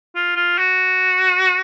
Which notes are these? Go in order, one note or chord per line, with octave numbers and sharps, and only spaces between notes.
F4
F4
F#4